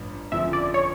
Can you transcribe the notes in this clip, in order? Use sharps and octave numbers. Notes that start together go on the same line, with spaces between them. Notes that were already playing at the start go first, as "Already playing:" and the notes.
Already playing: A1 G2 F3
G1 F2 C#3 F3 E5
D5
C#5